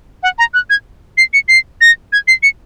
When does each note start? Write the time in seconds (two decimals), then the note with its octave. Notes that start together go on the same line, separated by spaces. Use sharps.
0.23 F#5
0.38 A#5
0.54 F#6
0.70 G#6
1.18 C7
1.34 C#7
1.48 C7
1.81 A#6
2.13 G#6
2.28 C7
2.43 C#7